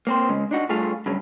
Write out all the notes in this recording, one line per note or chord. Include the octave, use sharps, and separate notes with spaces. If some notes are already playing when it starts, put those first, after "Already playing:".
A#3 C4 C5
C#3 G#3
D4 D#4 F#4
G2 A3 F4 G#4 F5
G2 C#3 F#3